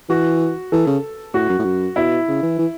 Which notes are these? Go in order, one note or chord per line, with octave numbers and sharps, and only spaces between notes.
E3 F#4
E3 A4
C#3
A2 F#4
F#2
A2
F#2
B2 E4
C#3
E3
E3